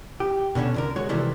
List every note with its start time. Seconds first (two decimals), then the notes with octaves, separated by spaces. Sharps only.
0.20 G4
0.55 B2 D3 B3 C#4 D4
0.74 C2 D3 A#4
0.96 G#3 F#4 C#5
1.09 C3 D#3 E3 G3 A3 C4